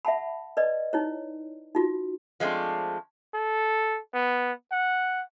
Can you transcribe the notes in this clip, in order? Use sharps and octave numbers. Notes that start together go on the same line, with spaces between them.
E5 F#5 A5 B5
B4 D5 D#5
D#4 E4 C#5
D#4 F4 F#4
F3 G#3 A3 B3 C4 D4
A4
B3
F#5